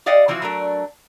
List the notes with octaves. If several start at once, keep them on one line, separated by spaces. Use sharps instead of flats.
G4 D5 D#5 F5 F#5
E3 F3 C4 E4 F#4
F#3 A3 D4 A#4